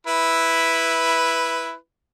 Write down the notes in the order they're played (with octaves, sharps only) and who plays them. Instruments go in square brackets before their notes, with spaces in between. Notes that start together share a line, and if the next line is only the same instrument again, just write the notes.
[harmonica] E4 B4